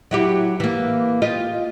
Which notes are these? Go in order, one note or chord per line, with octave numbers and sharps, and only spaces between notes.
F#3 E4 G4
E3 A#3
F4 G4 D#5